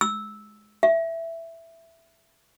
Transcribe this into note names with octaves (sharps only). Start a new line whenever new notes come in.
E6
E5